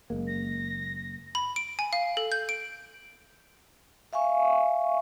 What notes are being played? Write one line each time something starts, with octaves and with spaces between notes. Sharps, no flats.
F#1 G#3 A#3
A#6
B5
D7
G#5
F5
A4
G6
D7
E5 F5 G#5 C#6